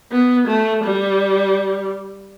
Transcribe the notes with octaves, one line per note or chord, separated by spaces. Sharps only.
B3
A3
G3